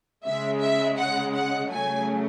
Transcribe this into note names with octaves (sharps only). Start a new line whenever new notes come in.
C#3 G#3 E5
E5
F#5
F#5
C#3 F#3 A3 G#5